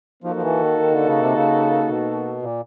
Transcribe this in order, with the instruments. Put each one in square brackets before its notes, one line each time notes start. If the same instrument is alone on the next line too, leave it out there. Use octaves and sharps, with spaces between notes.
[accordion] F3 [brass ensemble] A#3 D#4 F#4 A4
[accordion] F3
E3
D#3
D#3
D3
C#3
C3
C#3
B2
A#2